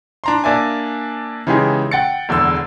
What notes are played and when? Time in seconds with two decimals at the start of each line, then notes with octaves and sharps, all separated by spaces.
0.24 D4 A#5 C6
0.44 A#3 D4 D5 E5 G#5
1.47 C#3 E3 G#3 D#4 G4 G#4
1.91 F#5 G5 A6 C#7
2.29 E1 E2 D3 E6